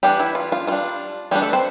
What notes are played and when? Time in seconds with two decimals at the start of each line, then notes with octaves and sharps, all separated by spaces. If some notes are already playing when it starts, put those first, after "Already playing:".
0.03 E3 G3 B3 D4 G4
0.20 E4
0.35 F4
0.52 F4
0.67 G3 D4 F4
1.31 E3 G3 B3 D4 G4
1.42 A3 A4
1.53 C4 C5